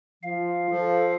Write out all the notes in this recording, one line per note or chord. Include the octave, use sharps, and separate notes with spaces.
F3 F5
F3 A4